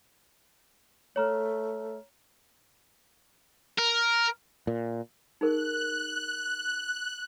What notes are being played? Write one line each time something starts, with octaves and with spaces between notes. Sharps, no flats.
A3 C#5 A#5 F6
A#4
A#2
D#4 G#4 A#4 F#6